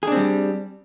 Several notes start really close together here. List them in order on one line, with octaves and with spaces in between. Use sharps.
G#4 D4 C4 G3